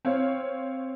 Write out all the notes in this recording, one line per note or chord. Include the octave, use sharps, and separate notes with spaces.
C4 C#5 F5